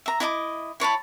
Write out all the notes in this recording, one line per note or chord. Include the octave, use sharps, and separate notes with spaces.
E5 A#5
E4 D#5 A5 D6
E4 C#5 A5 B5